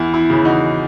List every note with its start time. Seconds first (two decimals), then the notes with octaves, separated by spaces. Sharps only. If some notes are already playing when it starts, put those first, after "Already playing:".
Already playing: E2 E4
0.14 E4
0.30 C#3 E3
0.45 D#4 F#4